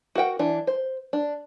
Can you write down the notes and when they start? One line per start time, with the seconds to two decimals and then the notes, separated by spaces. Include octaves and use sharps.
0.15 F#4 A#4 F#5 G5
0.39 E3 D4
0.67 C5
1.13 D4